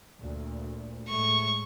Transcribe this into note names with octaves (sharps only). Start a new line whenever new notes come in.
D2 A#2
A2 G#3 A3 C#6